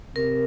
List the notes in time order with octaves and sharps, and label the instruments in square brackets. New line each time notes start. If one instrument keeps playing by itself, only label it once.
[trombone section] C3 [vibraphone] A#4